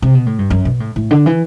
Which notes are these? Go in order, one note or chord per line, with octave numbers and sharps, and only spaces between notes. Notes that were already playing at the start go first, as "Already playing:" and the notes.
C3
B2
A2
G2
F#2
B2
A2
A2
D3
E3